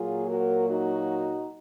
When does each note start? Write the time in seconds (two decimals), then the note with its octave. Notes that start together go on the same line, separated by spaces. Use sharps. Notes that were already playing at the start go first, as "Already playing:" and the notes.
Already playing: A#2 F#3 A#3 F4 G#4
0.27 F#4 A#4
0.67 D#4 F#4